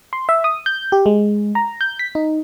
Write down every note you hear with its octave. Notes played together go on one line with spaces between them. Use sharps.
C6
E5
D#6
G6
G4
G#3
A#5
G6
B6
D#4